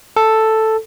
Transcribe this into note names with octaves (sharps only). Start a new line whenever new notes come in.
A4